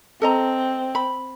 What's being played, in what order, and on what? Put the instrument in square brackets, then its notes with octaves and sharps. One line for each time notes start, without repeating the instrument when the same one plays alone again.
[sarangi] C4 [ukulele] A4 D#5 A#5
[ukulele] B5